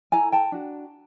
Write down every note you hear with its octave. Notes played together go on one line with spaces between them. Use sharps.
E4 A4 G#5 A#5
G5 A5
D4 F#4